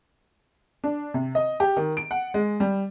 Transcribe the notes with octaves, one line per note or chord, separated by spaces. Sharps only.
D4
C3
D#5
G4
D#3
D7
F#5
G#3
G3